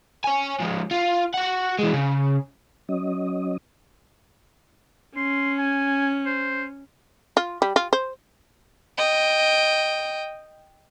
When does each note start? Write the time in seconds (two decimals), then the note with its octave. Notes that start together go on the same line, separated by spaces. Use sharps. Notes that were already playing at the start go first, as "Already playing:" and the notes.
0.24 C#5 G#5
0.60 F3 G#3
0.91 F4
1.34 F#4 F#5
1.79 E3 G#3
1.94 C#3
2.89 F#3 C#4 D#5
5.17 C#4 C6
5.59 G#5
6.26 C5
7.37 F4
7.62 G3
7.76 F4
7.93 C5
8.98 D#5 G5